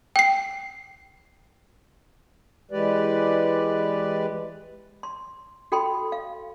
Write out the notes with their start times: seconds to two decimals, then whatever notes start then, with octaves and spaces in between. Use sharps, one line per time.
0.16 G5 C7
2.71 E3 G#3 G4 B4 D5
5.03 C6
5.72 F#4 A4 G5 B5 C6
6.12 F5